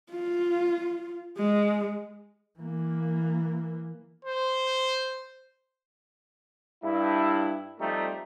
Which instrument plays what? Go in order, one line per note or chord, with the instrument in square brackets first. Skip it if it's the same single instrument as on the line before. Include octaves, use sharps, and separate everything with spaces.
[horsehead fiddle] F4
G#3
[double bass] E3 A#3
[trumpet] C5
[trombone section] G2 E4
F3 G3 A3 C4 D#4